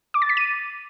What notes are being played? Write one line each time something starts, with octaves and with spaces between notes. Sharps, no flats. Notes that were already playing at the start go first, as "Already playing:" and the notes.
D6
A6
B6
D#7